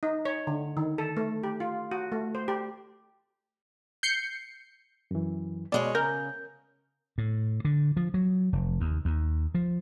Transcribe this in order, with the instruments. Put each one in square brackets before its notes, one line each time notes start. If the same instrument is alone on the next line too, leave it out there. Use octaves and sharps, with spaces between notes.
[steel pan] D#4
C#5
D3
D#3
A4
A3
G4
F4
F#4
A3
C5
G4
[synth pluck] G6 C7 C#7
[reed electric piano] F#2 E3
[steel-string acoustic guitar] B2 G#3 C#5 [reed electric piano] D5
[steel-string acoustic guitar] C#3 [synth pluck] A#4 [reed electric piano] G6
[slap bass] A2
D3
F3
F#3
F1
D#2
D#2
F3